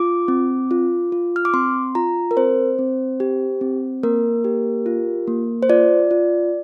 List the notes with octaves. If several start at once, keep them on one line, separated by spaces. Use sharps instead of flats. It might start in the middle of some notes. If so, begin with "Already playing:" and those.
Already playing: F4 D6
C4
F4
F4
F6
D6
C4 C6
F4 A#5
A#4
C4 C5
C4
G4
C4
A#3 A#4
G4
F4
A#3
C5
F4 D5
F4